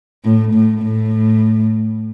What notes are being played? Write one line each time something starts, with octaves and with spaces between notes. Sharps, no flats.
A2
A2
A2